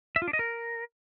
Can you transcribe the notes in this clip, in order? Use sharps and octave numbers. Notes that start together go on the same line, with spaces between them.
E5
F4
D4
D#5
A#4